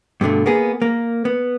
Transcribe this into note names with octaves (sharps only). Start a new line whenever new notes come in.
G2 B2 D3 A3
A#3 B3 G#4
A#3
B3